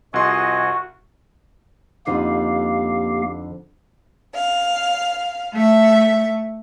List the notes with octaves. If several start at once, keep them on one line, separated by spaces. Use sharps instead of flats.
C2 F2 C3 F#4 D#5 G#5 C6
F2 D3 A#3 D#4 G4 F5
F5
A3 E5